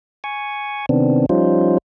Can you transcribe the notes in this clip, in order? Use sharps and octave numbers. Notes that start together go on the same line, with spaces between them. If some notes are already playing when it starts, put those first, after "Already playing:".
G#5 C#6
C3 D#3 B3 C4 D4
F3 G3 C#4 D#4 F4 C5